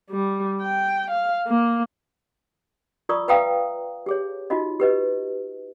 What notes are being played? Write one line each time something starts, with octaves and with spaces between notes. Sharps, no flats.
G3
G5
F5
A#3
F4 A#4 D5 A#5 C#6 D#6
B4 E5 F5 G5 A#5 D#6
G4 G#4 C#5
D#4 F4 F#4 D#5
G4 B4 D#5